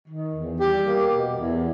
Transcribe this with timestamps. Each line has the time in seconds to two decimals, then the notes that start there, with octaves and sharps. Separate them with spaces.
0.08 D#3
0.35 E2
0.60 G3 G4
0.86 A#3
1.12 B2
1.39 E2